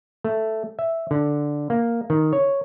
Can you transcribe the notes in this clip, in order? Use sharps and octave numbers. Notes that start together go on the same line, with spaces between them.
A3
E5
D3
A#3
D#3
C#5